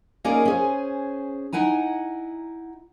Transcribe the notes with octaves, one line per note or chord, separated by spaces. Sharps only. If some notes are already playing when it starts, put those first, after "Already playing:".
A#3 C#4 D#4 G#4 A#4 D5
C#4 G#4 C5
D#4 E4 F#5 G#5 A#5